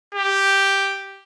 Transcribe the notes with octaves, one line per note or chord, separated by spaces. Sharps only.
G4